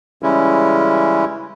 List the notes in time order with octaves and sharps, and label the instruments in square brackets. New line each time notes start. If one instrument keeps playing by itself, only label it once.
[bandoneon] C#3 E3 G3 G#3 C#4 E4